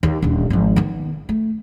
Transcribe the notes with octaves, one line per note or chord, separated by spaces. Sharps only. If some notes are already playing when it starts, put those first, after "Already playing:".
D#2
D#1 D3
G#1 F3
D#3 B3
A3